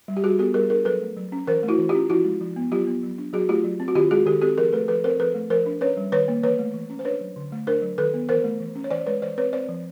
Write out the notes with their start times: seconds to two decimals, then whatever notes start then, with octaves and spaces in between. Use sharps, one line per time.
0.08 G3
0.17 G4
0.24 G3 F#4 G#4
0.39 B3 G4 A4
0.54 G3 G#4 A#4
0.70 D4 G#4 A#4
0.85 F#3 A4 B4
1.01 A3
1.17 F#3
1.32 C#4
1.47 E3 A#4 C5
1.63 A3
1.68 E4 F#4
1.79 E3
1.89 F4 G4
1.95 C#4
2.10 F3 E4 F#4
2.24 G#3
2.41 F3
2.56 B3
2.72 F#3 F4 G4
2.87 B3
3.03 F#3
3.18 D4
3.33 F#3 F#4 G#4
3.49 A3 F4 G4
3.64 F#3
3.80 C4
3.88 F#4
3.95 D#3 F4 G4
4.11 G#3 F#4 G#4
4.26 D#3 G4 A4
4.42 C4 G4 A4
4.57 F3 G#4 A#4
4.73 A3 A4 B4
4.88 F3 A4 B4
5.04 C4 A#4 C5
5.19 F3 A4 B4
5.34 A3
5.50 F3 A#4 C5
5.66 D4
5.81 C#4 B4 C#5
5.97 G3
6.12 D#3 B4 C#5
6.28 A#3
6.43 E3 B4 C#5
6.59 A3
6.74 E3
6.90 C#4
6.99 C5
7.05 D4 B4 C#5
7.21 F#3
7.36 D3
7.52 A3
7.67 D4 A#4 C5
7.82 F#3
7.98 D#3 A4 B4
8.14 B3
8.29 E3 A#4 C5
8.44 A3
8.60 E3
8.76 C#4
8.84 C#5
8.91 E3 C5 D5
9.06 G#3 B4 C#5
9.22 E3 C5 D5
9.37 C4 B4 C#5
9.53 C4 C5 D5
9.69 F3